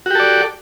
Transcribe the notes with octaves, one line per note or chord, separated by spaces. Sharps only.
F#4 G4 A4 D5